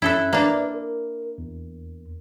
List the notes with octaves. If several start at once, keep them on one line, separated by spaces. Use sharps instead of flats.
F#2 C#4 E4 A4 E5 F#6
A#3 D4 B4 D5 E5
A#4
E2